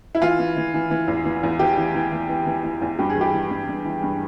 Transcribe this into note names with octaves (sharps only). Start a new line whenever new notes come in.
E4
E3 F4
E3
E3
E3
E3
E2
E3
E2
E3 G4
E3
E3
E3
E3
E3
E3
E2
G2 G4
G#4
E3
G4
E3
G2
G2
E3
G2